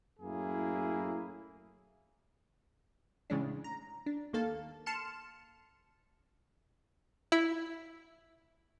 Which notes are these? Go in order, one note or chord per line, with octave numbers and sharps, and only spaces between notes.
F#2 A2 A#3 E4 G#4
A2 C#3 E3 G#3 C#4 D4
A#5
D4
D#2 D#3 A#3 A4 F5 A5
A5 C6 F6 C#7 E7
E4